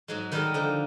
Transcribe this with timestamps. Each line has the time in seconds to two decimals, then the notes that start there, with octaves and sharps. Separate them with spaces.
0.08 G#2 F#3 G#3
0.32 D#3 G3 G#3 A4 A#4 D#5
0.54 D3 F3 A#3 D#4 A#4